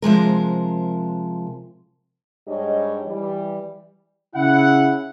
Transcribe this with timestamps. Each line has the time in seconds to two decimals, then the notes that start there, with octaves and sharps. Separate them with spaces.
0.02 C3 F3 G#3 A#4
2.48 G#2 G3 D4 G4 C#5 D#5
3.06 E3 G3
4.35 C#3 E4 F#5